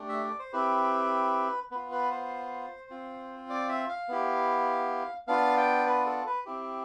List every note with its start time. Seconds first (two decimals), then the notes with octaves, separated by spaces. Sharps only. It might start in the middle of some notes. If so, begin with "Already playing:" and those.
Already playing: A3 D4 G4
0.09 E5
0.24 D5
0.39 C5
0.53 C4 E4 G4 B4
1.71 B3 F4 B4
1.92 B4
2.11 C5
2.90 C4 F4
3.50 D5
3.69 E5
3.89 F5
4.09 B3 E4 G4
5.28 B3 D4 F4 F5
5.57 G5
5.87 B4
6.06 A4
6.26 B4
6.46 C4 E4 G4